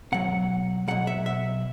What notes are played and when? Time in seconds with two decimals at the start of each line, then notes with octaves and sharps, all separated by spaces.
0.12 B2 F#3 F#5
0.88 B2 F#3 F#5
1.07 E5
1.26 E5